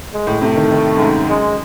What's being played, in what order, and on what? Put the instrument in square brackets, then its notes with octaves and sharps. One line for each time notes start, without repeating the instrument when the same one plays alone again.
[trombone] G#3
[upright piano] A2
[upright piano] C3 [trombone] A3
[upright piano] D#3
D#3
F#2
G#2
[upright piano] F#2 [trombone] G#3